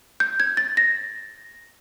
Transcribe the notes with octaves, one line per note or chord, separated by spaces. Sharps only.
G6
G#6
A6
A#6